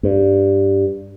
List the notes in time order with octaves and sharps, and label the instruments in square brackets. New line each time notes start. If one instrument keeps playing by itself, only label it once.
[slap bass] G2